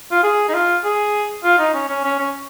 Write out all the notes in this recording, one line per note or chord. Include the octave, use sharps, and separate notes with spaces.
F4
G#4
D#4
F4
G#4
F4
D#4
C#4
C#4
C#4
C#4